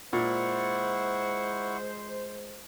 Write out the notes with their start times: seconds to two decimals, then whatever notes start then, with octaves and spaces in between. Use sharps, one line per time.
0.13 A#2 G#3 E4 C5 F#5 C#6